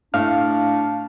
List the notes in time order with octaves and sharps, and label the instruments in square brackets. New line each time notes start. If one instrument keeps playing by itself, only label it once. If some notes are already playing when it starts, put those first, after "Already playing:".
[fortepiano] A2 [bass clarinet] D4 [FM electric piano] F5 F6